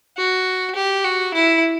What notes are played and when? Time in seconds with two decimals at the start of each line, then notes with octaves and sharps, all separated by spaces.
0.17 F#4
0.75 G4
1.04 F#4
1.34 E4